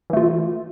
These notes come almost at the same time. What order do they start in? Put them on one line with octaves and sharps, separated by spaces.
E3 A3 F4